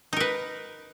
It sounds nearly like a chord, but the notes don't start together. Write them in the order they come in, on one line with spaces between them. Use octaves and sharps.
D#4 A#4 B4